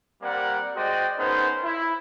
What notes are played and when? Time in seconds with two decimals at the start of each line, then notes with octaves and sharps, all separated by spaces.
0.23 G3 A#3 C4 A#4 D5 F#5
0.76 G#3 F#4 C5 D5 D#5 G5
1.18 B3 C#4 D#4 G#4 A#4 C5
1.64 E4